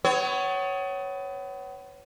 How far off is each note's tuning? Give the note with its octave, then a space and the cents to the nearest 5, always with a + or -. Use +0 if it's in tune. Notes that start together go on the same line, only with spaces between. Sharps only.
B3 +35 C#5 +0